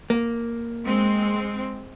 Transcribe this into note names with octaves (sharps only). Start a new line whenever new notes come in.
A#3
G#3 C4